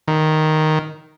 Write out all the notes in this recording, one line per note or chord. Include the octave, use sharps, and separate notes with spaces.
D#3